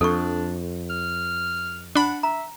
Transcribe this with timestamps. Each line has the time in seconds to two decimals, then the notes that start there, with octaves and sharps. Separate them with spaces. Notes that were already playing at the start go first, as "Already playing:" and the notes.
0.01 F2 D4 A4 C#6
0.90 F6
1.95 D4 F#5 B5
2.23 E5 A#5